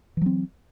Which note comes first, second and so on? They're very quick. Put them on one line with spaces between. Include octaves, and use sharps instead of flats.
E3 F#3 C4